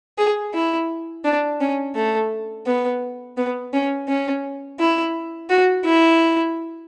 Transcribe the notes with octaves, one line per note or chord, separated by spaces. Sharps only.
G#4
E4
D4
C#4
A3
B3
B3
C#4
C#4
E4
F#4
E4